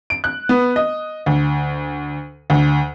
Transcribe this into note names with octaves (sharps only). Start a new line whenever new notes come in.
D7
F#6
B3
D#5
D2
D2